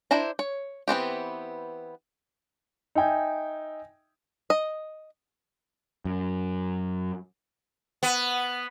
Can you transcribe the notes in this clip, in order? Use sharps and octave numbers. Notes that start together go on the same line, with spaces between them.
D4 E4 C5 A#5
C#5
E3 B3 C4 G4
D#4 E5 G5 G#5
D#5
F#2
B3